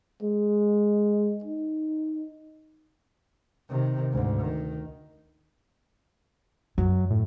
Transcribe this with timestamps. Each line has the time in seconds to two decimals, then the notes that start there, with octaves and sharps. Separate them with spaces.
0.23 G#3
1.44 D#4
3.69 C3 D#3
4.12 D2 G#2
4.41 D#3
6.78 F#2 F#3
7.10 A2